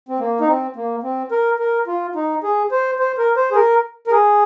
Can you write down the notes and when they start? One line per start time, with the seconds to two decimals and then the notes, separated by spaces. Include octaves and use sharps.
0.09 C4
0.19 A#3
0.41 D#4
0.48 C4
0.76 A#3
1.03 C4
1.31 A#4
1.59 A#4
1.87 F4
2.15 D#4
2.43 G#4
2.72 C5
2.99 C5
3.18 A#4
3.37 C5
3.52 G#4
3.56 A#4
4.07 A#4
4.11 G#4